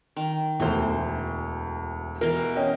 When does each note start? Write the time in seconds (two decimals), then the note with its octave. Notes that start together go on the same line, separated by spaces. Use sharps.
0.16 D#3
0.60 E1 D2 E3 C5
2.21 B2 E3 A#4
2.56 C#4 D#5 G5